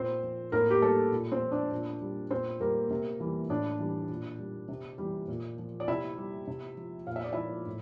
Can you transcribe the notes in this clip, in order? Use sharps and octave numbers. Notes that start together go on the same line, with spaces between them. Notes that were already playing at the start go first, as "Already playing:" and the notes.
Already playing: A#2 C4 C5
F3
A2 A#3 A#4
G4
G3 A3 A4
A#2
C4 C5
F3
D4 D5
A#2
G3
A#2 C4 C5
G3 A#3 A#4
C3
E3 G3
A2 D4 D5
E3 G3
A#2
G3
C3
E3 G3
A#2
F3
D5
C3 E4 E5
G3
C3
F3
A#2 F5
E5
D5
F3 E4 E5
A2